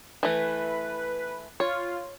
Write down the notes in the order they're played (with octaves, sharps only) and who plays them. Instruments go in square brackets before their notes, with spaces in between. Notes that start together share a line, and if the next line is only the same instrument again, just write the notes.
[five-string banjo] E3 A3 [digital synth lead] B4
[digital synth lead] F4 [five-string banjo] C#5